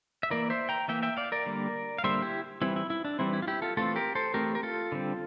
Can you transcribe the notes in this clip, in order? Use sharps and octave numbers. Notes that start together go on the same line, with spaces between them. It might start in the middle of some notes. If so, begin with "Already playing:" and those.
E5
E3 A#3 A#4 D5
C5 E5
G5 A#5
E3 A#3 E5 G5
E5 G5
D5 F5
A#4 D5
D3 G3 A#3
F5
D3 G3 A#3 C5 E5
E4 G4
E3 G3 C4 E4
E4
E4
D4
E3 G3 C4 E4
E4
F4
E4 G4
F4 A4
E3 A3 C4 F4 A4
G4 A#4
A4 C5
E3 A3 C4 G4 A#4
A#4
F4 A4
D3 G3 C4